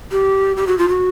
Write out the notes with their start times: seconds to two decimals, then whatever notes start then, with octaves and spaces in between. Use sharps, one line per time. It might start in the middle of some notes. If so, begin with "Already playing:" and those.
0.12 G4
0.57 G4
0.67 F#4
0.78 F4
0.89 F#4